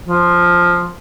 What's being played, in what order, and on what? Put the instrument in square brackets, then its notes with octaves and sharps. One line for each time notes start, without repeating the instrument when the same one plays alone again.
[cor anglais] F3